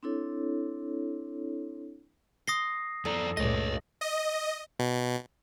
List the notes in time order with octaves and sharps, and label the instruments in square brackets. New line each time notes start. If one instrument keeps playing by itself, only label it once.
[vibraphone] C4 D4 E4 A4 C#5
[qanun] C6 [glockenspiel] D#6 A#6 C7
[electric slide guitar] F2 D5 A#5 [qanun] A4
[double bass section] C#2 G2 A#2 [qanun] A3 [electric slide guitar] C#5 D#5 [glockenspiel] A#6
[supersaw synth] D#5
[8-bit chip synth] B2